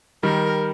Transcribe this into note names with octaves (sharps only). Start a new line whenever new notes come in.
D#3 G3 A#4